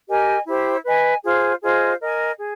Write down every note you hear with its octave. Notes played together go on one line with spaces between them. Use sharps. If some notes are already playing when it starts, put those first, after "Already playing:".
G4 A#4 D#5 G#5
E4 G4 C5
B4 D#5 G#5
F4 G#4 C5
F4 G#4 C5 D#5
A#4 D#5 G#5
G#4